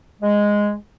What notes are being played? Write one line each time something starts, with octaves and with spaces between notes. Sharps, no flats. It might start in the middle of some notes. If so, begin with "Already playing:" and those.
G#3